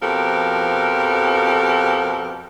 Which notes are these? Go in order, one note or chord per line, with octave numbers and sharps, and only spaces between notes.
F2 B2 F3 G4 A4 A#4